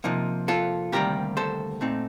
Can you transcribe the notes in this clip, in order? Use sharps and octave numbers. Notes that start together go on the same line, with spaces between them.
C3 F3 A#3 D#4
F4 A4
D2 C3 D#3 G3 A#3 G4 A#4
A4 C5
A#2 A3 C4 D#4